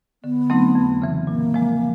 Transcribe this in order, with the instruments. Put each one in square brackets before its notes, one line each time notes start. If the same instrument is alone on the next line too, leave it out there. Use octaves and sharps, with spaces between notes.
[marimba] D3 [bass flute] B3
[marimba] F#3 A3 C4 D#4
F2
C#3 E3
[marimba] A#2 [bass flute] A#3
[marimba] F3 G#3